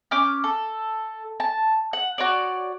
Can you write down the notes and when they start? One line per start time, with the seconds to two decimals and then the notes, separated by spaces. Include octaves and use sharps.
0.11 C#4 D6 F6 G6
0.44 A4
1.40 A5
1.93 F#5
2.18 F#4 C#5 D5